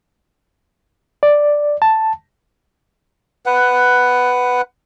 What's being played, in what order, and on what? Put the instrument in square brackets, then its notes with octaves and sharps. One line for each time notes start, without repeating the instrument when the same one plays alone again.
[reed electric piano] D5
A5
[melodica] B4 F#5